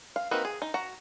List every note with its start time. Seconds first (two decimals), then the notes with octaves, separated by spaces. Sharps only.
0.16 F5
0.31 A#3 C4 D#4 F#4 B4
0.45 G#4
0.62 D#4
0.74 F#4 A#5